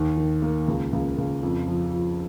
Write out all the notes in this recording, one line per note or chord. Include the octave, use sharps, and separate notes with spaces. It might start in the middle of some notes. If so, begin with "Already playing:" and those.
Already playing: D#2
D#3
A#3
C#2
C#2
C#2
F2
F3
F3